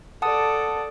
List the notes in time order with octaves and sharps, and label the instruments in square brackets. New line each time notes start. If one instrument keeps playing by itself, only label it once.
[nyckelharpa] A4 D5 [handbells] F#5 A5 D#6